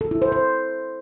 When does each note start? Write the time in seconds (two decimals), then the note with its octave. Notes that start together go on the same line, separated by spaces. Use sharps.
0.01 A4
0.11 E4
0.22 C5
0.32 C5